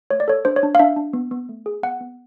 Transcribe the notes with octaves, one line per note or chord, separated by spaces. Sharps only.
A3 C#5
D5
A4 C#5
D4 C5
C#5
D4
F5
D4 E5
D4
B3
B3
A3
G#4
B3 F#5
B3